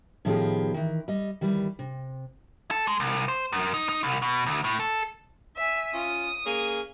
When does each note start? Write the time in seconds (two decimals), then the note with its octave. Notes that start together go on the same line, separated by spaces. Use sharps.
0.25 A2 D#3 F3 B3 G4 G#4
0.74 D#3 E3
1.08 G3 D#5
1.41 D#3 E3 G3
1.79 C3
2.71 A4
2.88 G#3
3.00 C2
3.28 C5
3.53 F#2
3.74 D#4
3.89 D#4
4.03 C2
4.22 B2
4.46 D2
4.64 A2
4.80 A4
5.56 E5 G#5
5.94 C#4 F4 D#6
6.45 A#3 C#4 G#4